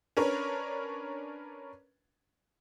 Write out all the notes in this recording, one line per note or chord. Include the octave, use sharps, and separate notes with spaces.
C#4 D4 A#4 B4 C#5